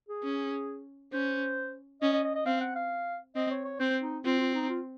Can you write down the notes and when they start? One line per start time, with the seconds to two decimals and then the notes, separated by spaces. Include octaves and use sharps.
0.09 G#4
0.23 C#4
1.13 C#4 C5
2.02 C#4 D#5
2.13 D#5
2.24 D#5
2.35 D#5
2.46 C4 F5
2.61 F#5
2.76 F5
3.36 C4 D#5
3.51 C#5
3.65 C#5
3.80 C4 C5
4.02 D#4
4.25 C4 F4
4.40 F4
4.54 D#4
4.69 F4